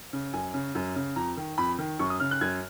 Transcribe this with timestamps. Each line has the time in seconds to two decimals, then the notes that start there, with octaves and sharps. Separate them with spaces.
0.13 C#3
0.33 F#2 G#5
0.54 C#3
0.75 F#2
0.96 C#3
1.16 F2 A#5
1.37 D#3
1.58 F2 B5
1.79 D#3
1.99 F#2 C#6
2.10 D#6
2.20 C#3 F6
2.31 F#6
2.41 F#2 G#6